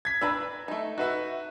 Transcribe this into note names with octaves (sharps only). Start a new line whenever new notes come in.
G#6 B6
D4 B4 A#5 E6
A3 D#4
D#4 F#4 B4 E5